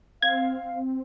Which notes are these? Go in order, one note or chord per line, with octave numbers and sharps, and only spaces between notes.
C4 F5 G#6